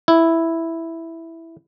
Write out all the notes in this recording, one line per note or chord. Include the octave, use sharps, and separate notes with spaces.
E4